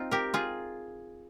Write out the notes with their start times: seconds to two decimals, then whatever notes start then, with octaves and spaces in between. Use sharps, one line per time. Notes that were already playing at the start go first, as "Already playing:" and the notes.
Already playing: C4 D#4 F4
0.11 G4 A#4
0.34 F4 G#4